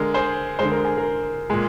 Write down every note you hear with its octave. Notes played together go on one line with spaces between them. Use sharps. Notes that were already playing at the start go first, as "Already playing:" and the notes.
Already playing: D3 G#3 A#4
G#4 C5
D3 G#3 C5
A#4
G#4
A#4
A#2 G#3